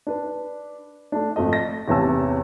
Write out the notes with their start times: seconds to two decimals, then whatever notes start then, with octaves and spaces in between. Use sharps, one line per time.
0.07 D4 B4
1.12 A3 D4
1.36 G#1 F2 A3 D#5
1.53 A#6
1.88 A1 E2 C3 G#5 A5 E6